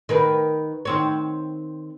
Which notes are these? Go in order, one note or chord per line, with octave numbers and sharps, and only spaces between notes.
D#3 A#4 B4
D#3 C4 C#5